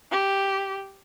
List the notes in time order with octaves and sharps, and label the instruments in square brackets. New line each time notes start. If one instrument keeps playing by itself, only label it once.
[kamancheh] G4